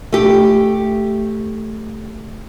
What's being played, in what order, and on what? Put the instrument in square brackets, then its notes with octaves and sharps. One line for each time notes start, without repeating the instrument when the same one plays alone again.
[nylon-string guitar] A3 G4